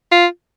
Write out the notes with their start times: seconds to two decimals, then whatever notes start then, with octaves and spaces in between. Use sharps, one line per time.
0.12 F4